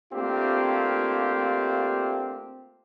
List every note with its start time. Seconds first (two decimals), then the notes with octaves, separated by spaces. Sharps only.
0.13 A3 A#3 C4 D4 F4 G4